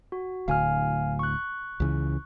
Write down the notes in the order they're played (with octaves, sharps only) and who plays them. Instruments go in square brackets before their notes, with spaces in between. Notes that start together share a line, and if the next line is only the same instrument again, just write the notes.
[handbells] F#4
[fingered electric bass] D1 D2 [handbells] F5 G#5 F6
[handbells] C#6 F#6
[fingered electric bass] C#2 C#3 E3